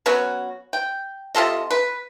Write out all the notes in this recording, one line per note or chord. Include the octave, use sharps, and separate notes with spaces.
F#3 B3 C#4 F#4
G5
C3 F4 A4 D#5
B4